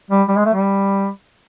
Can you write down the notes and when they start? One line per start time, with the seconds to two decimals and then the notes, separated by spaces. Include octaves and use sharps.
0.11 G3
0.28 G3
0.37 G#3
0.46 A3
0.54 G3